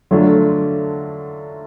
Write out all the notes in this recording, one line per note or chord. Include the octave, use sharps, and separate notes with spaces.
D3 F#3 A3 D4 F4